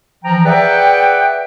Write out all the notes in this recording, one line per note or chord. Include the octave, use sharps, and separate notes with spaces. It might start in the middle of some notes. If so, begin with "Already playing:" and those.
E3 F3 G5 A#5
G#4 B4 D5 E5 F#5 G5